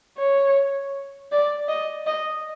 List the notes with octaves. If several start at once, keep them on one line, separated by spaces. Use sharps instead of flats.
C#5
D5
D#5
D#5